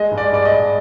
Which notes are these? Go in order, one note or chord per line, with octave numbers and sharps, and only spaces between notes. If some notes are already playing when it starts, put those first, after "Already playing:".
Already playing: G#3 D#5
G2
D5
G2 D5
D#5
G2